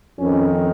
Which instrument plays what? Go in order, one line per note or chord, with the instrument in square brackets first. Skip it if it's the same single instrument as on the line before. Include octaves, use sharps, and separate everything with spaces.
[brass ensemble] F2 D#3 C#4